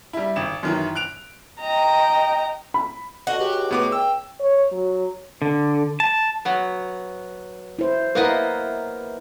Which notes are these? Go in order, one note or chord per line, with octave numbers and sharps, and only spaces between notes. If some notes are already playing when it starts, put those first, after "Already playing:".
G3 E4
G#1 E7
F#2 D#3 E3
F#6 D7 F7
D#5 G5 A#5
B5
D3 F#4 D#5
C#2 G4
A2 B3 D6
G5 E6
C#5
F#3
D3
A5
F#3 B3
E4 C5
A#3 B3 E4 A#4 B4 D#5